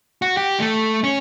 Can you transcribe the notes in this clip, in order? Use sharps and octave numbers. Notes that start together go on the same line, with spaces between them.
F#4
G4
A3
C#4